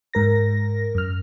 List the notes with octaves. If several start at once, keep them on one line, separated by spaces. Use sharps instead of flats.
G#2 A#4 A#6
F#2 F6